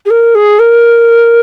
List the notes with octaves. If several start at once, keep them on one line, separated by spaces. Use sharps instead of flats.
G#4
A#4
G#4
A#4